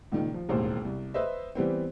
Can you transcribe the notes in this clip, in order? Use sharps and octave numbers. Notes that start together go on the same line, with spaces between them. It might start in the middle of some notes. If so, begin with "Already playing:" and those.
C#2 A#2 D#3
F3
E1 A1 D#2 C5
C2
B4 C5 D#5 E5
E3 G3 B3 C4